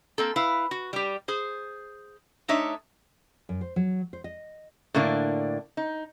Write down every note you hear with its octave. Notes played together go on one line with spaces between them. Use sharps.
A#3 C4 A4
E4 B4 F5
F#4
G3 G4
G#4 C5
A3 D4 D#4 C#5 E5
F#2
C5
F#3
C5
D#5
A2 D3 A#3 D4
D#4